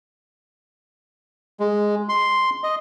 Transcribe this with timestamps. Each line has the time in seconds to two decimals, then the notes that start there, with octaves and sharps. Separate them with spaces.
1.60 G#3
2.09 C6
2.63 D#5